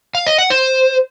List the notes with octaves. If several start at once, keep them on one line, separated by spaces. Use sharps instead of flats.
F5
D#5
F#5
C5